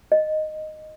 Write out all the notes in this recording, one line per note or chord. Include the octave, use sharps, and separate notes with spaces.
D#5